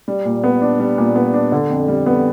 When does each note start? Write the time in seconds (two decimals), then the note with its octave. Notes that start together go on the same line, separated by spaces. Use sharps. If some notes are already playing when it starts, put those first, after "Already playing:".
0.08 G3
0.25 A#2
0.44 B3
0.62 D4
0.80 G3
0.98 A#2
1.15 B3
1.34 D4
1.52 D3
1.70 F2
1.88 G3
2.06 B3